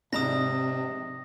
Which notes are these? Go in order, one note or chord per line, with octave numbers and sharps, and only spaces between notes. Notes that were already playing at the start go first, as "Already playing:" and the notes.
G#2 C3 C4 D4 A#5 D#6 A#6